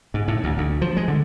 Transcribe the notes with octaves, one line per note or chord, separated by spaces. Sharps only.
G#2
A2
D2
D2
F3
G#3
D3